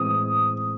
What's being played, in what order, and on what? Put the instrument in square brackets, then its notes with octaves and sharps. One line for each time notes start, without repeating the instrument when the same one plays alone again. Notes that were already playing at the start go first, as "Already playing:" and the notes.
Already playing: [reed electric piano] A2 E3 G#3 C4 [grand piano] D#6